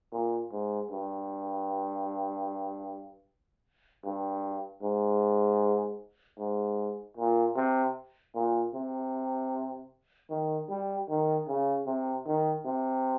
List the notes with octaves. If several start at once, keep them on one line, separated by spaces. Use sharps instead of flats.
A#2
G#2
G2
G2
G#2
G#2
A#2
C3
A#2
C3
D#3
G3
D#3
C#3
C3
D#3
C3